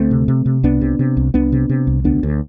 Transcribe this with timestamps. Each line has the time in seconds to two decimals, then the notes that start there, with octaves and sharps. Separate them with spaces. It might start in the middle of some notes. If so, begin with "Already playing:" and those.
Already playing: D2 A3 C4
0.11 C3
0.28 C3
0.46 C3
0.63 C2 B3 D4
0.81 C3
0.99 C3
1.17 C2
1.34 C2 B3 D4
1.52 C3
1.69 C3
1.87 C2
2.04 D2 B3 D4
2.23 D2